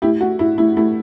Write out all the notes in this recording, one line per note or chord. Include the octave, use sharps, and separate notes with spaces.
A2 E4 G4
A3 F#4
A2 E4
A2 E4
A3 E4